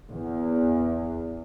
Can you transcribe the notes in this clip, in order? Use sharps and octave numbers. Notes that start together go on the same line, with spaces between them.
E2